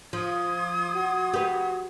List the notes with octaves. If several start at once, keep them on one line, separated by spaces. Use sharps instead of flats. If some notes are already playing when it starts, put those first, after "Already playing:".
F3 C6 D#6 G#6
F#4
G4 B4